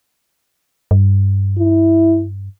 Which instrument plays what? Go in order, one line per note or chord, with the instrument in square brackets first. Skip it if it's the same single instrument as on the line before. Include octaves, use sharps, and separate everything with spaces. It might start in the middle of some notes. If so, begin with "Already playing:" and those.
[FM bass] G2
[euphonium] E4